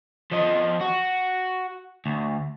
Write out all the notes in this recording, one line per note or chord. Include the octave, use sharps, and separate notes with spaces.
F3 D#5
F#4
D2